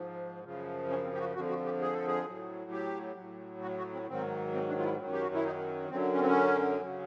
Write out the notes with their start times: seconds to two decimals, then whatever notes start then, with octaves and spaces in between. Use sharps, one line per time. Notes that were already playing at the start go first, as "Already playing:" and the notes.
Already playing: G#2 F3
0.44 F#2 C#3 F3
0.90 C#4
1.04 C4
1.14 G4
1.20 F#4
1.34 F2 D3 F3 F#4
1.49 F#4
1.65 G4
1.81 G#4
1.93 A4
2.07 G#4
2.26 A2 F#3
2.71 G4
3.16 A2 F#3
3.62 F#4
3.78 F#4
3.93 C4
4.08 G#2 D#3 F#3 C4
4.54 C4
4.68 D4
4.79 F4
4.85 E4
5.00 F#2 D#3 F#3
5.13 G4
5.21 F#4
5.34 E4
5.45 D#4
5.90 F#2 D3 F#3 C4
6.13 C#4
6.20 C4
6.27 C#4
6.81 C#3 F#3